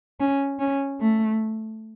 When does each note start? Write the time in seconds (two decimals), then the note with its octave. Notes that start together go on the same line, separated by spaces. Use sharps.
0.20 C#4
0.60 C#4
1.00 A3